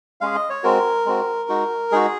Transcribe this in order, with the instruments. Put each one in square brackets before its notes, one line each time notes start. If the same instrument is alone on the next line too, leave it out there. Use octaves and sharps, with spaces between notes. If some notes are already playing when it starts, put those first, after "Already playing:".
[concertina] G#3 C#4 G#4 F5
D#5
C#5
G#3 C4 F#4 A#4
G#3 C4 F#4
G#3 D#4 F#4
G#3 D#4 F#4 G#4